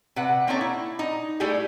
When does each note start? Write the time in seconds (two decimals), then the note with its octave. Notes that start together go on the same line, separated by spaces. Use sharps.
0.16 C3 B4 F#5
0.47 A#3 C4 C#4 D#4 A4 C#5
0.61 E4
0.99 D#4
1.40 G3 A3 E4 G4 G#4